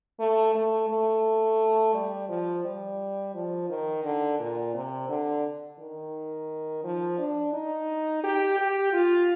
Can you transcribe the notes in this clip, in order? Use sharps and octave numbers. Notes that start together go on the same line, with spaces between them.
A3
A3
A3
G3
F3
G3
F3
D#3
D3
A#2
C3
D3
D#3
F3
D4
D#4
G4
G4
F4